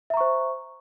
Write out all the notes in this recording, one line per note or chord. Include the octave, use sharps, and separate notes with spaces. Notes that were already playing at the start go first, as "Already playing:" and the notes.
C5 E5 A#5 C#6